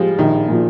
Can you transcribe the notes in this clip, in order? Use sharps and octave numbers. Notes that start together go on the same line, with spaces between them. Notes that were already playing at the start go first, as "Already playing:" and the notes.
Already playing: F3 G3 G#3
A#1 D#3
A#2 F3